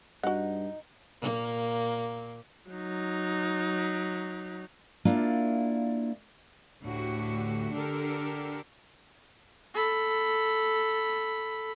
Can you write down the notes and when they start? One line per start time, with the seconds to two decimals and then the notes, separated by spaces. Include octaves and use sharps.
0.23 G2 D#4 F#4 F#5
1.21 A#2 A#3
2.70 F#3 D#4
5.05 A#3 D4 E4 F4 D5
6.84 D2 A2 D3 F#4 G4
7.73 D3 D4 G4 A4 A#4
9.74 A4 B5